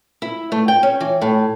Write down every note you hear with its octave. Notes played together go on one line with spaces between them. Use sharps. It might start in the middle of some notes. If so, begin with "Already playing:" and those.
E4
A3
G5
C#4
E3
A2